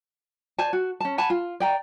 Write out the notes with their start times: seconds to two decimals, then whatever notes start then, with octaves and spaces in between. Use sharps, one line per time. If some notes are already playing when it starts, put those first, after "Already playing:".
0.58 C5 D5 G#5 A5
0.73 F#4
1.00 C#4 A5
1.18 F#5 G#5 A5 B5
1.30 F4
1.60 D5 G5 A#5